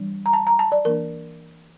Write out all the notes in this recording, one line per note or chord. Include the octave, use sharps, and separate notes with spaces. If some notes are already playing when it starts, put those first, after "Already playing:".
Already playing: E3 G3 D4
A#5
A5
A#5
A5
D5
E3 A#3 D4 A#4